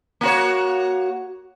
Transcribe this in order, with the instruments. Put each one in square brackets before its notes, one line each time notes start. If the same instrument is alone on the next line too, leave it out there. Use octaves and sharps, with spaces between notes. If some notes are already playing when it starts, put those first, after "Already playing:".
[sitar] A#3 F#4 C#5